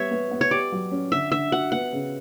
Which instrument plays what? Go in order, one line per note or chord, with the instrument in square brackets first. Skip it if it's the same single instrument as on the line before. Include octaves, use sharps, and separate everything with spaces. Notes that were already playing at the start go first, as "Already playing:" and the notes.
Already playing: [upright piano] G3 B3 [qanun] C#5 E5
[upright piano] B3
B3
[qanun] C#5
[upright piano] G4 [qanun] D5
[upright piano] F#3
C#4
[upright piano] D3 [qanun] E5
[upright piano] D3 [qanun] E5
[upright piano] F#4 [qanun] F#5
[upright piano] B3 [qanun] F#5
[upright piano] C#3